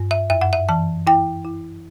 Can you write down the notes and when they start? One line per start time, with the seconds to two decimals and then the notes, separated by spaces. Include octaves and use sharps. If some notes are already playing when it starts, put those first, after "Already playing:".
Already playing: G2
0.11 E5
0.30 F#2 E5
0.41 F#5
0.53 E5
0.69 E3 A5
1.07 E4 G5
1.45 E4